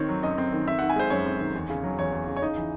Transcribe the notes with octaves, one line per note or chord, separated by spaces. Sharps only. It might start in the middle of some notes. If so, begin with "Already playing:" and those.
Already playing: D#3 C4 C#5
F#3
F#2 D#5
C4
D#3
C4 E5
D#3 F#5
G#5
G#3 C5
F#2 C#5
C4
D#3
E2
C#3
F#3
E2 C#5
E2
C#3
C#5
D#4 D#5
E3